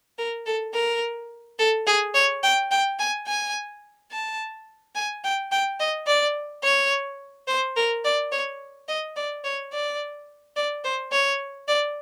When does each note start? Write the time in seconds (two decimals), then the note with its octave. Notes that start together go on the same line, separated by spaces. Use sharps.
0.18 A#4
0.46 A4
0.74 A#4
1.59 A4
1.87 G#4
2.14 C#5
2.43 G5
2.71 G5
2.99 G#5
3.27 G#5
4.11 A5
4.95 G#5
5.24 G5
5.52 G5
5.80 D#5
6.07 D5
6.63 C#5
7.48 C5
7.76 A#4
8.05 D5
8.32 C#5
8.88 D#5
9.16 D5
9.44 C#5
9.72 D5
10.56 D5
10.84 C5
11.12 C#5
11.68 D5